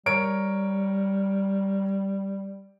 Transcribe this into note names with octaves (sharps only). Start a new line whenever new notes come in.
G3 A#4 C#5 D7